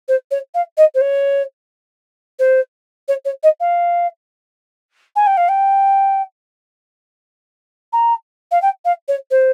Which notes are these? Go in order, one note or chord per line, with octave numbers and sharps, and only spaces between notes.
C5
C#5
F5
D#5
C5
C#5
C5
C#5
C#5
D#5
F5
G#5
G5
F5
G5
A#5
F5
G5
F5
C#5
C5